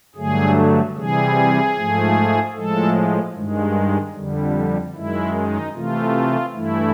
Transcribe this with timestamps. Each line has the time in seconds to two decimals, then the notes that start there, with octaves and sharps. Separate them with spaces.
0.15 G2 D3 F#3 A3 G#4
0.96 C3 E3 G3 G#4
1.75 G#2 F3 A3
2.54 A2 F3 G#3 A4
3.34 G2 D#3 G#3
4.13 F2 D3 G3
4.94 F#2 D#3 G#3 E4
5.33 D#4
5.73 C3 E3 A3 F4
6.53 G2 E3 A3 E4